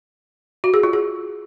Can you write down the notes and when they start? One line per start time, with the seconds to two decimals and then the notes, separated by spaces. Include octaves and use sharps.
0.64 F#4
0.74 G#4
0.83 F4
0.93 G#4